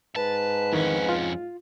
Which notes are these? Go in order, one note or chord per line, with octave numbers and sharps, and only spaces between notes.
G#2 B4 A5
F2 D#3 E3 C#4
F4